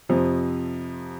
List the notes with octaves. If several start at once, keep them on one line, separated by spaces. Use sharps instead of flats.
F2 C3 F3